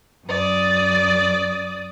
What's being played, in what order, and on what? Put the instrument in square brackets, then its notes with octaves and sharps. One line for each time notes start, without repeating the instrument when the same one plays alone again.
[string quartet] F#2 D5 D#6